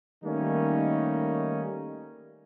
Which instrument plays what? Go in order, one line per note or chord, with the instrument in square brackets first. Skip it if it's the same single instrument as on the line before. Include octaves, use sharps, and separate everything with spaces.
[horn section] D#3 G3 A3 A#3 C#4 D#4